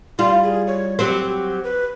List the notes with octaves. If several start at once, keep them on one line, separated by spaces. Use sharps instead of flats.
G3 F4 C6
G#4
C#5
F#3 C4 G4
B4